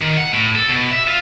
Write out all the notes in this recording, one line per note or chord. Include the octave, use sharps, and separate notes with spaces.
D#3
F#5
A2
A4
B2
E5
F4